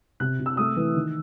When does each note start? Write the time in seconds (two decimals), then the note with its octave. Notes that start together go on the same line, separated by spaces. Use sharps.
0.20 C3 F#6
0.40 C3
0.46 E6
0.57 A3 D#6
0.76 E3
0.95 D#3